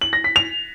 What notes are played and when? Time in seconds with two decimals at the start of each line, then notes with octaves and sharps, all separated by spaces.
0.01 F#7
0.13 A#6
0.24 B6
0.36 F7